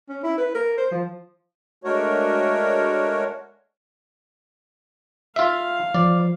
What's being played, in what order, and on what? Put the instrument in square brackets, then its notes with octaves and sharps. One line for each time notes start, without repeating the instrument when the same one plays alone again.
[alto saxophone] C#4
E4
B4
A#4
C5
F3
[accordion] G#3 A3 D4 F#4 A#4 C#5
[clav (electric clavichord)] F4 E5 [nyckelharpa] F5
[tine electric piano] F3 [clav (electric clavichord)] D5